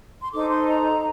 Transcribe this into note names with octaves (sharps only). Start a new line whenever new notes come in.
C6
D#4 A4 C5 D6
C6
A#5